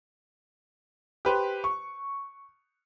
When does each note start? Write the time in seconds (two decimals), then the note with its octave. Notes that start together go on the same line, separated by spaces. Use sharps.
1.25 G4 B4 C5
1.64 C#6